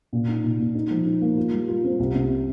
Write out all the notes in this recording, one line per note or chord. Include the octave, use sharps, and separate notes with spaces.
A#2
D#4
A#2
A#2
D#4
F3
D#4
A#3
F4
G3
F4
C4
C2
C3